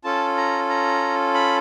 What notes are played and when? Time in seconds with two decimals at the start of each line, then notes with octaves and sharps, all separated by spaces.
0.04 C#4 F4 A4 A5
0.37 A#5
0.69 A#5
1.34 B5